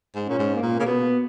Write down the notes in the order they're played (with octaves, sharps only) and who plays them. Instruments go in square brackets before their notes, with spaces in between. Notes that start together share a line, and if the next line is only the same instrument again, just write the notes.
[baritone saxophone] G#2
[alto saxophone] C#4
[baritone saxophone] A#2
G#2
[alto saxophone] A#3
[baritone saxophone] A#2
[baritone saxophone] C#3 [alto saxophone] A#3
[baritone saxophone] B2 [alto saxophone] B3